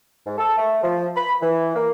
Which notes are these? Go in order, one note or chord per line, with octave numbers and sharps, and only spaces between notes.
G#2
A4
A3
F3
B5
E3
A#3